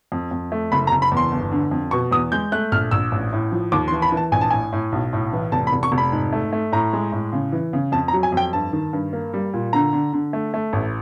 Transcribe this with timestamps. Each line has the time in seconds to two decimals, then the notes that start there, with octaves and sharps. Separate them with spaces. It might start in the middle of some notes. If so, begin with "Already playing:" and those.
0.12 F2
0.31 F2
0.52 A3
0.72 F#1 B5
0.87 A#5
0.92 F#1
1.02 B5
1.12 E2 C6
1.32 G1
1.52 D3
1.71 F2
1.91 B2 C#6
2.11 E2 D#6
2.32 G#3 G6
2.52 A3 F#6
2.72 A#1 F6
2.91 A#1 E6
3.12 A1
3.33 A2
3.52 F3
3.72 D#2 D6
3.88 C6
3.92 E3
4.02 B5
4.12 E3
4.17 A5
4.32 A#1 G#5
4.41 A5
4.51 A2 G#5
4.73 A2
4.92 B1
5.13 A2
5.33 E3
5.52 F1 A5
5.67 B5
5.72 F1
5.83 C#6
5.92 F1
5.98 B5
6.12 G#2
6.32 A3
6.53 A3
6.72 A2 A#5
6.93 G#3
7.12 A2
7.33 C#3
7.52 E3
7.73 C#3
7.92 F2 A5
8.08 A#5
8.13 F#3
8.23 G#5
8.32 F2 G5
8.53 G2 A5
8.73 D#3
8.93 G2
9.13 A#3
9.34 G3
9.54 A#2
9.73 D3 A#5
9.93 D3
10.13 D3
10.33 A3
10.54 A3
10.73 A1